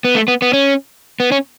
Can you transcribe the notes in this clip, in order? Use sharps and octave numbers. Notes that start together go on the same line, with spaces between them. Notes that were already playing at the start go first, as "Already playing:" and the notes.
B3
A3
B3
B3
C#4
B3
C#4